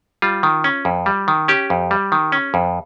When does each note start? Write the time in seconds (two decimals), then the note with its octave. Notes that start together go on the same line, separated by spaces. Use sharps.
0.22 G3 F4
0.43 D#3
0.64 C#4
0.85 F2
1.06 G3
1.28 D#3
1.48 C#4 G4
1.70 F2
1.91 G3
2.12 D#3
2.32 C#4
2.54 F2